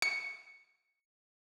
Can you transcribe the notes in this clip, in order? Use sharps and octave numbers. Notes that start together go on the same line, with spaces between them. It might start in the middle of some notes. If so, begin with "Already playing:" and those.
C#7